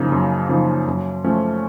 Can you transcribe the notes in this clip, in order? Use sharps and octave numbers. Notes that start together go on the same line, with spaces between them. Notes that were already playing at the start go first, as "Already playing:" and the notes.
Already playing: F#2 C#3 F3 A#3 D#4
F#2
C#3 F3 A#3 D#4
F#2
F3 A3 C#4